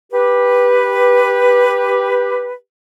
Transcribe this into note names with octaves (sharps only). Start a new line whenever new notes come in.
G4 B4